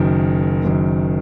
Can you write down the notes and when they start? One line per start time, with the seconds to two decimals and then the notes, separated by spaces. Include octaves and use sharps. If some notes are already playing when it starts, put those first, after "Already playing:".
Already playing: F#1 F#2 D#3
0.65 F#1 F#2 D#3